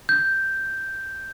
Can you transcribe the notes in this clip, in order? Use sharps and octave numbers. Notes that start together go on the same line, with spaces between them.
G6